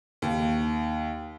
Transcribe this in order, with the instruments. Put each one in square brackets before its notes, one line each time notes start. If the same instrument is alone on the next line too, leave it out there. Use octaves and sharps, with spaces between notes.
[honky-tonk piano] D#2